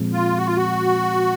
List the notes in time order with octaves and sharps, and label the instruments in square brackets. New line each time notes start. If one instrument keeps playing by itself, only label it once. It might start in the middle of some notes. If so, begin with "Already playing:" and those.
Already playing: [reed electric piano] A#2 F3 G#3 C4
[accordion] F4
F#4
F4
F#4